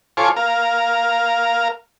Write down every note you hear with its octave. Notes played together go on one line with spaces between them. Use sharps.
F4 A4 C5 C#5 G#5 D6
A#4 F5